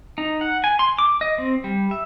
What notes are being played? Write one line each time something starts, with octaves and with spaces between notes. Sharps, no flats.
D#4
F#5
G#5
C6
D6
D#5
C4
G3
E5